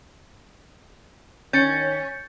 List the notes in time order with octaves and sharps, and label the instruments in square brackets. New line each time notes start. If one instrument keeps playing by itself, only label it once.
[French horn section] D#3 C#5 [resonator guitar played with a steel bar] C#4 [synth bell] G6 A6 C#7